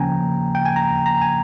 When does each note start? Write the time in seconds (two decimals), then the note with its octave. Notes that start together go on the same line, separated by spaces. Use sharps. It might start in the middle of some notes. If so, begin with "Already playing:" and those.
Already playing: C#3 F3 A#3 C#4 G5 G#5 A#5
0.55 G5
0.66 G#5
0.76 A#5
1.06 A#5
1.21 G#5